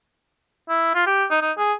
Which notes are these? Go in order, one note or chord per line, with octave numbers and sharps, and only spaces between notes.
E4
F4
G4
D#4
D#4
G#4